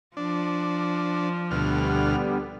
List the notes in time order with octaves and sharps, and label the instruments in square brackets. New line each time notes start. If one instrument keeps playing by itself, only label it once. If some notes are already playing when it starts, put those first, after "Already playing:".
[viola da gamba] F3 [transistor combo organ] D4
[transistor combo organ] D2 B2 F6 [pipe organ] D3 G3 B3